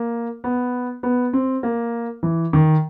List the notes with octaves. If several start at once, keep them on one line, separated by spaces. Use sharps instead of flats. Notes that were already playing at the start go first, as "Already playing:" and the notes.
Already playing: A#3
B3
B3
C4
A#3
E3
D#3